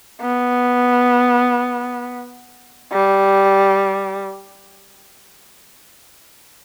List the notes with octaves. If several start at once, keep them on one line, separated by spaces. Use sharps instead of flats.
B3
G3